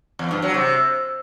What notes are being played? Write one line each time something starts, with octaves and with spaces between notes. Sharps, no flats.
E2
G2
F#3
C3